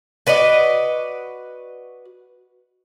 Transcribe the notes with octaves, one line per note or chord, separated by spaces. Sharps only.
F#4 B4 D5 D#5